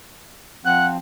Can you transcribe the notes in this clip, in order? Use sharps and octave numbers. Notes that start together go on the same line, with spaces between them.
F3 C4 F#5 F#6